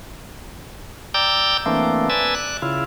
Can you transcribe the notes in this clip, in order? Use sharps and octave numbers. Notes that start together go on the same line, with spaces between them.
D5 G5 A#5 D6 E6 G6
E3 A3 A#3 C4 D4
B4 D5 G#5 A5 E6
D5 F#6
C#3 E4 F4